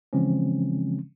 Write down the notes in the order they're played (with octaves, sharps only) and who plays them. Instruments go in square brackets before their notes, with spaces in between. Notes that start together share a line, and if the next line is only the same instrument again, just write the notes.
[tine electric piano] C#3 E3 F3 G#3 C4 C#4